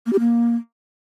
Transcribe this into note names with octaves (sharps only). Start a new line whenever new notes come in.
A#3
G4
A#3